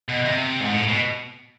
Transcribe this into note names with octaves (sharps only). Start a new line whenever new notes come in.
B2
C3
G#2
A2
B2